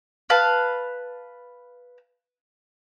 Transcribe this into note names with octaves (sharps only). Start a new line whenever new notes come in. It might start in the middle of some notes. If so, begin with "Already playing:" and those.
B4 F5 A5